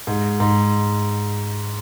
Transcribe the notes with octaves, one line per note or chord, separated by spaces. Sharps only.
G#2
G#2